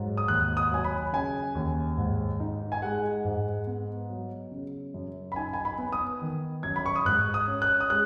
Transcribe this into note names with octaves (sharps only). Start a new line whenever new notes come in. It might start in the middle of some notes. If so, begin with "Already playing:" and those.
Already playing: G#2 F#3
D#6
D#2 F#6
D#6
F#3 G#5
B5
C#3 G#5
D#2
G#2
D#4
G#5
G#3 F#5
G#2
B3
F#3
C#3
F#2
B5
D#4 G#5
G#5
B5
B3
D#6
D#3
F#2 G#6
B5
C#6
D#6
G#2 F#6
D#6
C#4
F#6
D#6
G#3 F#6